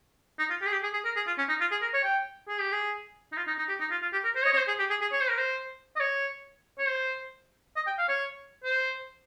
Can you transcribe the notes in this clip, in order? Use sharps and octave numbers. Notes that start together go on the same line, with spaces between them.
D#4
F4
G4
G#4
G4
G#4
G#4
A#4
G#4
F4
C#4
D#4
F4
G#4
A#4
C#5
G5
G#4
G4
G#4
D#4
F4
D#4
D#4
G4
D#4
F4
F4
G4
A#4
C5
C#5
D#5
C#5
C5
G#4
G4
G#4
G#4
C#5
C5
A#4
C5
D#5
C#5
C#5
C5
D#5
G5
F5
C#5
C5